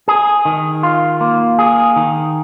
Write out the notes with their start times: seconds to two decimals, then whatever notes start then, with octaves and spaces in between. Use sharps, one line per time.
0.08 G#4
0.45 D#3
0.83 F4
1.21 A#3
1.59 G#4
1.96 D#3